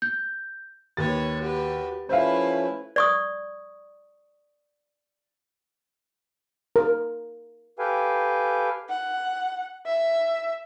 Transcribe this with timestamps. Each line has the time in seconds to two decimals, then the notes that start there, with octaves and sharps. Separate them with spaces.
0.02 G6
0.97 D#2 B4 C#5 A6
1.41 F#4 G4 B4
2.09 F3 A3 C#4 E4 B4 C5 E5 F5
2.96 D5 C#6 D#6
6.76 A#4
7.79 G4 A4 B4 F5 G5 G#5
8.90 F#5
9.86 E5